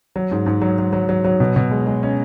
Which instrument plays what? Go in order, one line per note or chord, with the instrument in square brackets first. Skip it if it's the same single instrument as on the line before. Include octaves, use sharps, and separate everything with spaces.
[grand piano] F#3
G#2
G#2
F#3
F#3
F#3
F#3
F#3
B2
B2
G#3
G#3
C#4